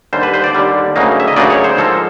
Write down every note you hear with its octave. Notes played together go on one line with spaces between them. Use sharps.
D#2 D3 G3 C5
B4
C5
D5
D#2 D3 G3
D2 C#3 F#3 A#3 D#4
E5
D#5
D2 C#3 F#3 A#3 D#4 D5
C#5
C5
G#2 F3 A#3 A4